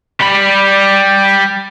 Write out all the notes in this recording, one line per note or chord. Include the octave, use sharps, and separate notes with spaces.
G3 B5